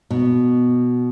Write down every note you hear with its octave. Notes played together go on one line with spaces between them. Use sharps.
B2